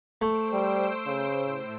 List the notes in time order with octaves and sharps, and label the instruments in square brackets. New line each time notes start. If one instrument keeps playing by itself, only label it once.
[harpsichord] A3 [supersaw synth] C5 E6 D7
[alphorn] G3
C#3
[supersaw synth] A2